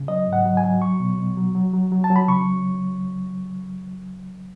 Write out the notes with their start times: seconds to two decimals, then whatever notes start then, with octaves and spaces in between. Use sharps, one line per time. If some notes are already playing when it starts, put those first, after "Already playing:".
Already playing: C#3
0.08 F#3 D#5
0.27 G#2
0.33 F#5
0.45 F#3
0.57 G#5
0.63 F#3
0.82 F#3 C#6
1.00 B2
1.18 B2
1.37 F#3
1.55 F#3
1.73 F#3
1.92 F#3
2.04 A5
2.10 F#3
2.16 B5
2.28 C#3 C#6